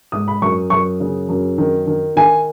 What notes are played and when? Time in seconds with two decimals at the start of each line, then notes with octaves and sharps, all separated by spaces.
0.12 G#2 D#6
0.28 B5
0.42 F#2 C#6
0.70 F#2 C#6
1.00 C#3
1.29 F#2
1.58 D#3
1.87 D#3
2.16 D#3 G#5